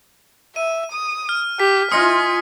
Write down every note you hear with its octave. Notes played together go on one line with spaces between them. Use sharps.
E5 D#7
D#6
F6
G4 B6
F4 D#5 G#5 C6 D#6 C#7